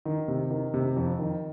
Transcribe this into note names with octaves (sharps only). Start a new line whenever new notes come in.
D#3
C3
D#3
C3
F2
D#3